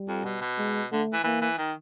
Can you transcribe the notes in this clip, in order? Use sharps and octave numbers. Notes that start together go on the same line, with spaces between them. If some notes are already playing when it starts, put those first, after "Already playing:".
Already playing: G3
F2
B2
B2
G#3
D3 A3
E3
E3 A#3
E3
D#3